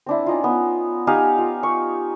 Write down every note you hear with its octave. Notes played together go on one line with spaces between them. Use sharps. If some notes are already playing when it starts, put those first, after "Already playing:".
C4 D4 E4
C#4 D#4 F4
B3
D#4 G4 F5 G#5
F4
C#6